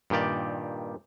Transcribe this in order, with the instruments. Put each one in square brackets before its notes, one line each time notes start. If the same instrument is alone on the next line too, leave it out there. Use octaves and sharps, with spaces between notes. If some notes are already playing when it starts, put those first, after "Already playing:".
[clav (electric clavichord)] G2 A#2 D#3 G4 D5